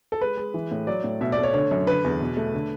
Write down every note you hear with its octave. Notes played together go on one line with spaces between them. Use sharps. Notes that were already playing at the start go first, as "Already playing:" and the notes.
A4
G#3 B4
G#3
E3
A2
F#3 D5
A2
B2 E5
D5
A3
C#5
D3 C#5
F#2
D3 B4
E2
B2
A3
D3